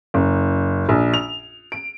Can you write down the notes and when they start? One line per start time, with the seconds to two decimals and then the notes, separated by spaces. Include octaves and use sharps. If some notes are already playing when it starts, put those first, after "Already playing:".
0.14 F#1
0.89 A#1
1.14 F7
1.72 D7